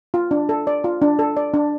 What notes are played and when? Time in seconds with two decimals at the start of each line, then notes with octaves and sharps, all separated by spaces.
0.14 F4
0.31 D4
0.49 A4
0.67 D5
0.84 F4
1.02 D4
1.19 A4
1.37 D5
1.54 D4